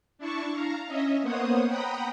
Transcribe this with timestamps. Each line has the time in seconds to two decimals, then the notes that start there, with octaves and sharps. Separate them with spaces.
0.18 D4 E4 A5 C#6
0.54 F5 A#5
0.87 C#4 D#5 E5
1.22 A#3 B3 C5 C#5 F#5 D#6
1.68 F#5 G5 A#5 B5 D#6